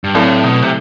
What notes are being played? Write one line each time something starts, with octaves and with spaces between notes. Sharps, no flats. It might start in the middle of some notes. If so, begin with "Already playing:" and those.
G2
A2 F#3 A3 C4 E4 A4
B2
C3